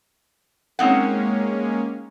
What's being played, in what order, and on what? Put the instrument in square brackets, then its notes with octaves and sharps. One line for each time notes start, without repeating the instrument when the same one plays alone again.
[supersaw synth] G#3 A#3 C#4 [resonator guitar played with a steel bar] C4 D#4 F#5